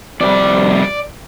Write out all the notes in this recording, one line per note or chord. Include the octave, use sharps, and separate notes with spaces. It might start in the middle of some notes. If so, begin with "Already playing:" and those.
F2 C3 G3 D5